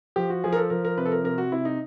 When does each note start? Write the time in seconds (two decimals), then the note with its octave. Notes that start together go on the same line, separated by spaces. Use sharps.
0.16 F3 G4
0.30 F#4
0.44 F3 G#4
0.53 A#4
0.56 A4
0.70 F3 A#4
0.85 A#4
0.97 C3 B4
1.05 A4
1.12 A#4
1.24 C3 A#4
1.38 F#4
1.52 C3 E4
1.65 D#4